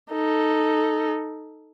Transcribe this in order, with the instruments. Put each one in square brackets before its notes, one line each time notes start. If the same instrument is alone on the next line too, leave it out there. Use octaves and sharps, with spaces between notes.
[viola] D#4 A4